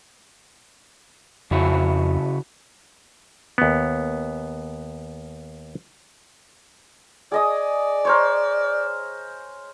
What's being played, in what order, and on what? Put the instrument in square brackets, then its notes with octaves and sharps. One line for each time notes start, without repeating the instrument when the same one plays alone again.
[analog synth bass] F2 [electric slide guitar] C#3 E4 F#4
[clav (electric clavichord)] D#2 B3
[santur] G#4 D#5 D#6 [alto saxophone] D5
[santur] A#4 C5 C#5